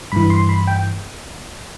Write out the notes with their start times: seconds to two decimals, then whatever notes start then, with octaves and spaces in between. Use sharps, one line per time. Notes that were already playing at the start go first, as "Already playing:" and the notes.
0.12 G2 E3 B5
0.30 C6
0.49 B5
0.67 G5